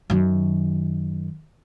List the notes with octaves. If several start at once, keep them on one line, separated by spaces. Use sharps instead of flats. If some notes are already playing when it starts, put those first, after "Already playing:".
F#2 D#3